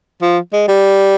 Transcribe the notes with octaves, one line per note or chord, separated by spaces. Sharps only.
F3
G#3
G3